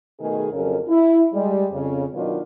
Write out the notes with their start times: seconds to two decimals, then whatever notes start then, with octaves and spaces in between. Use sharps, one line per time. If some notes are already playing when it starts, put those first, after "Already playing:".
0.19 B2 D#3 A3 G#4
0.52 F2 C#3 F#3 C#4 A4 A#4
0.87 E4
1.33 G3 G#3
1.72 F2 C#3
2.13 B2 D#3 F#3 D4 F4